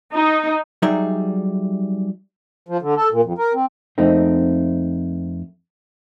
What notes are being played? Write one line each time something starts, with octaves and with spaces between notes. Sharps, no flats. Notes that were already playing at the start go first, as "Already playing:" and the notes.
D#4
F#3 G3 D#4 G#4 E5
F3
D3
A4
A#2
F2
A#4
C4
F2 A3 A#3 C4 D#4